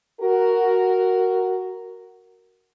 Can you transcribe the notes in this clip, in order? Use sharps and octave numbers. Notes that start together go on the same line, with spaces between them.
F#4 A#4